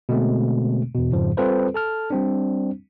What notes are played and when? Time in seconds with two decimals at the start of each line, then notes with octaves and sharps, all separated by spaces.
0.09 B2 D3 G#3 A3 C4
0.95 E2 B2
1.11 F2 G#2 C#3 F3
1.37 G3 C4 F4 A4 B4 C5
1.74 A4 A5 F6
2.10 G3 C4 D4